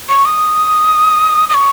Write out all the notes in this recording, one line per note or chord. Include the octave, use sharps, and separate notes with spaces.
C#6
D#6
D#6
C#6